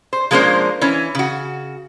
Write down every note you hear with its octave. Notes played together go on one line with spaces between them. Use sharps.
C5
F3 G#3 A#3 C#4 D4 C5
E3 C#4
C#3 F#4